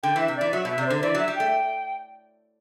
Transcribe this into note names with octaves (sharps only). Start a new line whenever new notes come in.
D3 G5
E3 E5
C3
E3 D5
F#3 E5
B2 E5
C3 D5
D3 C5
E3 D5
F#3 E5
G3
A3 G5